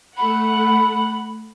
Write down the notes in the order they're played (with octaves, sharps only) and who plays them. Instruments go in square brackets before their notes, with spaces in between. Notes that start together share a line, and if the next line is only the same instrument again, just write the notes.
[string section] A3 F#5 [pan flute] B5